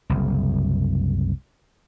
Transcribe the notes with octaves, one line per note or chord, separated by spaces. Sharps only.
F#1 C2